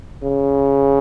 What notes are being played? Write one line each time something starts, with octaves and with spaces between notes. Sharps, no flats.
C#3